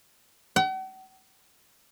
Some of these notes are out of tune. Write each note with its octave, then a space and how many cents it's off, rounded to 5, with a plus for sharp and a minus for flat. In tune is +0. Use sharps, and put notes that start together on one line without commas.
F#5 +45